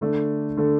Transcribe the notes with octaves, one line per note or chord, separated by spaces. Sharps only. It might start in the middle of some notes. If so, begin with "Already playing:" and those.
D3 A3 D4 A4
D3 A3 D4 A4